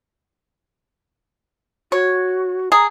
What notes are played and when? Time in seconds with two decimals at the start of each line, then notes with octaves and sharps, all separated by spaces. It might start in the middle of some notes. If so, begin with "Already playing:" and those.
1.92 F#4 C#5
2.72 G#4 A#5